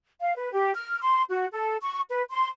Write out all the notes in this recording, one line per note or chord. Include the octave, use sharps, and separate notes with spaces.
F5
B4
G4
F6
C6
F#4
A4
C#6
B4
C6